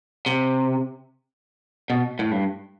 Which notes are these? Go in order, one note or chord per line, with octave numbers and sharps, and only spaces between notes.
C3
B2
A2
G2